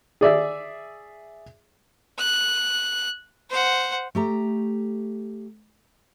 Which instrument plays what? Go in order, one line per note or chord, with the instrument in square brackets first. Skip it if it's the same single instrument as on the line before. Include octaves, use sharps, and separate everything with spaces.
[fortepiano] G#4 D5 E5
[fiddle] F#6
C5 F#5
[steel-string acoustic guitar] A3 G4 A#5